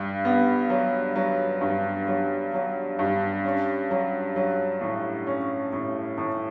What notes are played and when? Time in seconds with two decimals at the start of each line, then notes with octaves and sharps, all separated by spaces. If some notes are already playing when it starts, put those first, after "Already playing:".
Already playing: G2
0.25 B3
0.70 F#3
1.16 F#3
1.61 G2
2.08 F#3
2.53 F#3
2.99 G2
3.45 C#4
3.91 F#3
4.36 F#3
4.81 A2
5.27 C#4
5.73 A2
6.18 A2